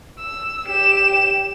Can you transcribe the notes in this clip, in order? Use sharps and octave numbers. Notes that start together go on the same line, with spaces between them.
E6
G4 E7